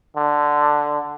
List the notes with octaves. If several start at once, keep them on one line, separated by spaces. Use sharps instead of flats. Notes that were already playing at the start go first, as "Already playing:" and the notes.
D3